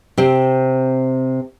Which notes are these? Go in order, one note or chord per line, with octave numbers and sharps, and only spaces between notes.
C3 C4